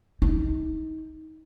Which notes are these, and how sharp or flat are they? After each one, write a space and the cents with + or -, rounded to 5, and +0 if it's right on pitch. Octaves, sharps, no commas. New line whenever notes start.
D#4 +25